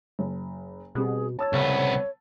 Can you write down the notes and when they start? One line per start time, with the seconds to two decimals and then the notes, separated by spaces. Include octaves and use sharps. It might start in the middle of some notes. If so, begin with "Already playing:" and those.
0.19 F#1
0.95 B2 G3 C4 G#4
1.39 C#5 A5 E6 A6
1.53 C2 C#3 B3